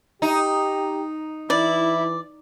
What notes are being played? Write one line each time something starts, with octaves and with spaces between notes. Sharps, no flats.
D#4 G4
E3 E4 D5